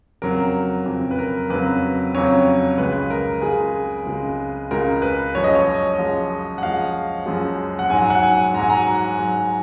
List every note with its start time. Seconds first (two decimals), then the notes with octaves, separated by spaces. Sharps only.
0.22 F2 C#3 F#3 A#4
0.86 F2 C#3 F#3
1.11 B4
1.19 A#4
1.50 F2 C#3 F#3 B4
2.15 F2 C#3 F#3 C#5
2.78 C#2 C#3 G#3 B4
3.10 A#4
3.42 C#2 C#3 G#3 G#4
4.06 C#2 C#3 G#3
4.71 C#2 C#3 G#3 A#4
5.02 B4
5.34 F#2 F3 G#3 C#5
5.44 D#5
5.55 C#5
5.98 F#2 F3 G#3
6.58 F#5
6.62 F#2 F3 G#3 F5
7.26 F#2 F3 G#3
7.79 F#5
7.90 G#2 F#3 G#5
8.10 F#5
8.23 G#5
8.54 G#2 A#5
8.59 F#3 G#5
8.70 A#5
9.19 G#2 F#3